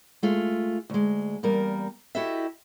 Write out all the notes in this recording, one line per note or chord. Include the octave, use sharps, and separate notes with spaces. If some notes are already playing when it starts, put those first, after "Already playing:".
G#3 A3 F4
D2 G#3
E2 G3 A#3 A#4
E4 F#4 G4 A4 D#5 E5